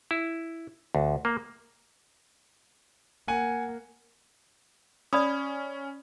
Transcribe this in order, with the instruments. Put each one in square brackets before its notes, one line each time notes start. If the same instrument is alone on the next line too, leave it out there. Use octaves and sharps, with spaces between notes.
[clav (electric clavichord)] E4
D2
A#3
[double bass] A#3 [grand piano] F#5 G#5
[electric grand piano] C#4 [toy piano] D5 B5 D#6